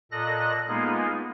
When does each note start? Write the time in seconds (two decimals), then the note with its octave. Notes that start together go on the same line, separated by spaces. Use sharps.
0.11 A#2 A4 D#5 F#6 A#6
0.68 G#3 A#3 B3 D#4 F4 G#4